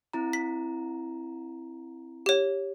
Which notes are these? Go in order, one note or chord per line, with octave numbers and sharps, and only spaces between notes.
C4 E4 A#5
B6
G4 C#5